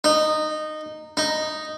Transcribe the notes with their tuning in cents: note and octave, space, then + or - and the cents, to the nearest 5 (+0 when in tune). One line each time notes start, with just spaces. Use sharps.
D#4 -15
D#4 -5